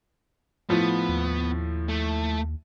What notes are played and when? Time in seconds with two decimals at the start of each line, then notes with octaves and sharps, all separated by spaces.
0.70 A2 F3 B3
1.09 D#2
1.89 A3